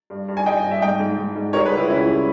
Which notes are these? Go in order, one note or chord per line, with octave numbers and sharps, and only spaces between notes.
G2
G2
G#5
G2 D#5 G5
G2
E5
G#2 D#5 G5
G#2
G#2
G#2
G3 A#4 C#5
G#4 B4
C#2
E4 G#4
C#2 C#4 E4
G3